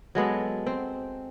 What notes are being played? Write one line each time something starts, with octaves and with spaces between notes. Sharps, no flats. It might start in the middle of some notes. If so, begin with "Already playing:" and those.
F#3 G#3 B3 A4
C4